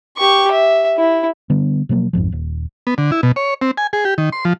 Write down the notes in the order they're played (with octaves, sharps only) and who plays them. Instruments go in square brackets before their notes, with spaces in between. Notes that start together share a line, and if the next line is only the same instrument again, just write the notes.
[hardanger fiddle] G4 C#6
E5
E4
[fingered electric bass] D3 G3 B3 D4
B2 F3 F#3 A#3
A#1 F2 G#2 F3
D#1
[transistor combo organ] B3
D3
E4
B2
C#5
C4
G#5
G#4
G4
D#3
C6
F3